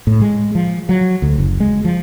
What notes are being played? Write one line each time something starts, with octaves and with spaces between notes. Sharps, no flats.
A2
G#3
F3
F#3
D2
F#1
G#3
F3